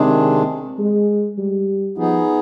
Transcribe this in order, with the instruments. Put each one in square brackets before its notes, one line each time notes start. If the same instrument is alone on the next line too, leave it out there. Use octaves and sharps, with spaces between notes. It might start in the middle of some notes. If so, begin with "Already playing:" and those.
Already playing: [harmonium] C3 D#3 G#3 D4 G#4 [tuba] C4
[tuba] G#3
G3
[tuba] F3 [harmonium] B3 D#4 G#4